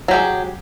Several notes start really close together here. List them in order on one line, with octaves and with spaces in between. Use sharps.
F#3 G4 G#4